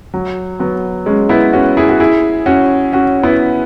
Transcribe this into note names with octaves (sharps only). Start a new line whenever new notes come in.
F#3
F#3 B3
G#3 C#4
B3 E4
C#4 F#4
E4 G#4
F#4
E4 G#4
C#4 F#4
C#4 F#4
B3 E4